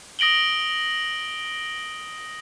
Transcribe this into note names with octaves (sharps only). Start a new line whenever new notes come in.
D#6 A#6 D7 F#7 G7